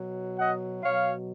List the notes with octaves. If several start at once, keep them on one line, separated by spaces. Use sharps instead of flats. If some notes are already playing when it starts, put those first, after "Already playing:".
Already playing: B2 F#3
D#5 F#5
B2 F#3 C#5 F5